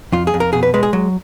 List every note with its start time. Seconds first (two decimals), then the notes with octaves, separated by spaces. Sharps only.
0.12 F2 F4
0.27 G#4
0.34 F2
0.40 A#4
0.53 B2 G#4
0.63 B4
0.74 G#3 B4
0.83 G#4
0.93 F#3